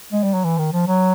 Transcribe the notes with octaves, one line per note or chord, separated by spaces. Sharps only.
G#3
G3
F#3
E3
D#3
F3
F#3